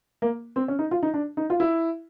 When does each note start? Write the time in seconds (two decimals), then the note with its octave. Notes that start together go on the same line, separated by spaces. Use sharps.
0.22 A#3
0.56 C4
0.68 C#4
0.79 D#4
0.91 F4
1.03 D#4
1.14 D4
1.37 D#4
1.50 F4
1.60 E4